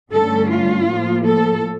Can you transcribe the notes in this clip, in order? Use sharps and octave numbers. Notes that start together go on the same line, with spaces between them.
G2 D3 A3 C#4 A4
F4
A2 F3 A#3
A4